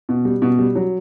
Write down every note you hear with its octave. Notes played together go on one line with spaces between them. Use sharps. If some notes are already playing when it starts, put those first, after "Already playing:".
B2
G3
B2
G3
F#3